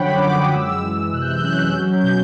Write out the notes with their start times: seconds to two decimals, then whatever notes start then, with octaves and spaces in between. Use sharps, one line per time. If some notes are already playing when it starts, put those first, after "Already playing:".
Already playing: F#2 D3 F3 C#5 F#5 G5 B5
0.13 D6
0.23 F#2
0.33 D#6
0.54 G#3 E6
0.83 E3
1.13 C3 F#6
1.22 G6
1.30 F#6
1.38 G6
1.44 C#4 F#6
1.73 F#3 G6
1.93 G6
2.03 B2